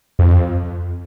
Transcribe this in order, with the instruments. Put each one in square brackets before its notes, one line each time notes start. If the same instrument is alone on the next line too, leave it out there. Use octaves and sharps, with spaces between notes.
[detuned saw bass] F2